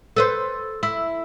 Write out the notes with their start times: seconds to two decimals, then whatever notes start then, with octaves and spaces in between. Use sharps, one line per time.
0.16 A4 B4 C5
0.83 E4